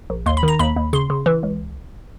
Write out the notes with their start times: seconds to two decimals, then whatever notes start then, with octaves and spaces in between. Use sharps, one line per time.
0.10 A#1
0.26 D#2 C6
0.37 B5
0.43 D#3 A#5
0.59 D#2 B5
0.76 D#2
0.93 C#3 C6
1.10 C#3
1.26 E3
1.43 C#2